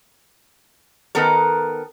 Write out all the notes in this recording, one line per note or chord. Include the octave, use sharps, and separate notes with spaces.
D#3 B3 A4 A#4